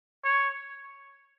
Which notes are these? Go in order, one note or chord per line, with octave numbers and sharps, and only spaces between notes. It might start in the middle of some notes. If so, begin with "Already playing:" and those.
C#5